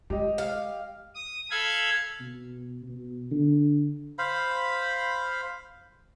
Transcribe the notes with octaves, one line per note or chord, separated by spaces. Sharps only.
G#3 G4 D#5
F5
D#6
A4 F5 B5 G#6
B2
B2
D3
C5 F5 B5